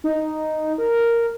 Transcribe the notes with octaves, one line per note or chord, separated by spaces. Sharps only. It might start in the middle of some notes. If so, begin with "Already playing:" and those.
D#4
A#4